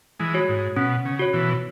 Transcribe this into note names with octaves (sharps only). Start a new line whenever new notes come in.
E3 G#3
F#4 C#5
G#2
B2 C#4
C#3
F#4 C#5
B2 E3